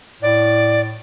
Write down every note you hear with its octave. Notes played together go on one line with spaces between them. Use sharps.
A2 D5